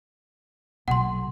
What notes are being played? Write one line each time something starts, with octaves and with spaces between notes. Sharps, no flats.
B1 F#5 C6